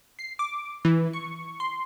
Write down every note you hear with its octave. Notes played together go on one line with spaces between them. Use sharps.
C7
D6
E3
C#6
C6